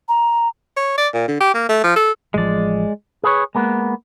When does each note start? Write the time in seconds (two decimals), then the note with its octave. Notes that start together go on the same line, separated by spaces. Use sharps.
0.08 A#5
0.77 C#5
0.97 D5
1.14 A#2
1.28 D3
1.40 G4
1.54 A#3
1.69 A3
1.84 F3
1.96 A4
2.34 A1 F3 G#3 D5
3.24 G#4 B4 C#5
3.55 G#3 A#3 B3